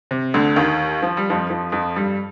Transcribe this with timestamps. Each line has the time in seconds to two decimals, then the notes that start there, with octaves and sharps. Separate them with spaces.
0.11 C3
0.34 D2 D3
0.56 D#2 D#3
1.02 F3
1.17 G3
1.30 F2 F3
1.49 F2 F3
1.72 F2 F3
1.96 G2 G3